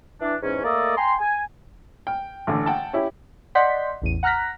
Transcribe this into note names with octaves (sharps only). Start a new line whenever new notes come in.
E3 D4
E2 G#2 C#4
A3 A#3 A4 D5 D#5
G5 G#5 A#5 C6
G#5
G5 F6
A1 D3
F#5 G5 A5
C#4 E4 G4
D5 D#5 F#5 C6 G6 B6
A1 E2 D#7
F#5 A#5 F6 F#6 A#6 B6